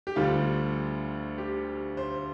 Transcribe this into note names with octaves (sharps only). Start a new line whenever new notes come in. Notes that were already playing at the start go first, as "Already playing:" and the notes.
G4
D2 D3 G3 F4
G4
C5